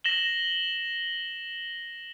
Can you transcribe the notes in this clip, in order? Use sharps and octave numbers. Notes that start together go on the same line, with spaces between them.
A#6 E7 F#7 G7